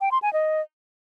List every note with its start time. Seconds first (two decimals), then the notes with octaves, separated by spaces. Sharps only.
0.01 G5
0.11 C6
0.22 G#5
0.33 D#5